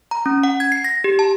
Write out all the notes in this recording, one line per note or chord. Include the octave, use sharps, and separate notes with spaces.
A#5
C#4
F#5
G#6
C7
A#6
G4
A5